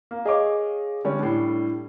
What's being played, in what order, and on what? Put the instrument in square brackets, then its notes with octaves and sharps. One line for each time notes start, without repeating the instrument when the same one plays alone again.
[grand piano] A#3
[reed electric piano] G#4 C#5 [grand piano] D#5 F5 D6
[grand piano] D3 G3 C#4
[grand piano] A2 G3 [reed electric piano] D4